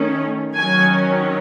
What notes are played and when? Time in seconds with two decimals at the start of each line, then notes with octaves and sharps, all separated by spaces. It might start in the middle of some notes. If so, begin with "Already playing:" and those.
Already playing: D#3 A3 C#4
0.56 D#3 F#3 C#4 G#5